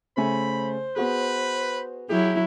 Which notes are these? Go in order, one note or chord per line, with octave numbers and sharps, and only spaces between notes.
C#3 A3 C5 G#5 B5
B3 F#4 G#4 B4
F#3 E4 G4 G#4